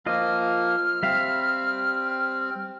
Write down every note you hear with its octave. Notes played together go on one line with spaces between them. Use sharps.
F3 A#3 F4 D#5 F6
G3 C4 E5 F5